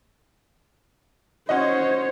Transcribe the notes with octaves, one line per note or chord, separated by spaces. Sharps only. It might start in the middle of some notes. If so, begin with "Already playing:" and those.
C#4 F#4 C5 C#5 D#5